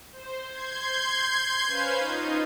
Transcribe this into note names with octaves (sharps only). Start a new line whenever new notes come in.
C5
C6 G6 G#6
C#4 B4 C5 F5
D#4 F4